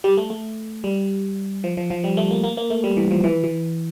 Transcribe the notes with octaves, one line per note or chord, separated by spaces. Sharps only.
G3
A3
A3
G3
F3
F3
F3
G3
A3
A#3
A#3
A#3
A3
G3
E3
F3
E3
E3